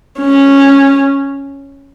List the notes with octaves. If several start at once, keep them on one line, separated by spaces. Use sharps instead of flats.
C#4